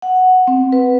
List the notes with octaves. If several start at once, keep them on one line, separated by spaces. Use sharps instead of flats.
F#5
C4
B4